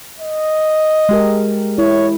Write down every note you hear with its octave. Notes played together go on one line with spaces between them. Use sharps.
D#5
G#3 G4 A#4
E4 C#5